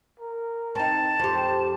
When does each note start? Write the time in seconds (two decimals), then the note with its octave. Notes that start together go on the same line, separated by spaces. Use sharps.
0.19 A#4
0.75 C4 D#4 A5
1.19 F2 G4 C5